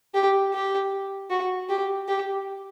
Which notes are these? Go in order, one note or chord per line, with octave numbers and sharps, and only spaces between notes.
G4
G4
F#4
G4
G4